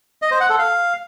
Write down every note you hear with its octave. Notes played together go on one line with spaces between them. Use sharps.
D#5
C5
F#5
A4
F5